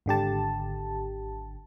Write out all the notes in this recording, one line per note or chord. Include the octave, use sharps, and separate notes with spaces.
G#1 D3 G4 A5